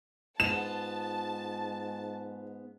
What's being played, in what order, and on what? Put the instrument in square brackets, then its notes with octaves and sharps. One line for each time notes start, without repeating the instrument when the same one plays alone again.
[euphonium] G#2 [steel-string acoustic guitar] B3 F4 [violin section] A5 [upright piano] E7